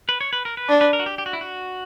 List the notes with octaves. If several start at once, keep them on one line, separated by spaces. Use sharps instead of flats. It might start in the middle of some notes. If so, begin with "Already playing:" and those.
B4
C#5
B4
A#4
B4
D4
B4
A#4
F#4
G4
G4
F#4
E4
F#4